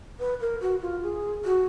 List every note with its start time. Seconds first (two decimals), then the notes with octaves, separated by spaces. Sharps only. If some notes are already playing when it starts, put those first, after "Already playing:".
0.19 B4
0.41 A#4
0.61 F#4
0.82 F4
1.03 G#4
1.45 F#4